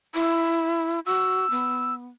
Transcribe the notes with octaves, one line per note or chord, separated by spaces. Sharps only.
E4
F#4 E6
B3